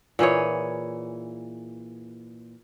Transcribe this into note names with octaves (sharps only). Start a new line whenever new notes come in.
A#2 E3 G#4 C#5